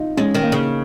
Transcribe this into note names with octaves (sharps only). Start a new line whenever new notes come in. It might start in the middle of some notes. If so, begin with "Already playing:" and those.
Already playing: D#4 F4
G#3 C#4
D#3
A#3
C#3